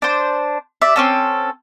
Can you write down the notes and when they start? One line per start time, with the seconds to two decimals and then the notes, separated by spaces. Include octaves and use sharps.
0.02 D4 C5
0.81 D5 E5
0.96 C4 C#4 A4